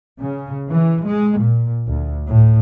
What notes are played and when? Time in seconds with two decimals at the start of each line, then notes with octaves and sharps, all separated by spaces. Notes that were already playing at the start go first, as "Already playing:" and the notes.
0.21 C#3
0.71 E3
1.08 G#3
1.41 A#2
1.88 D2
2.28 A2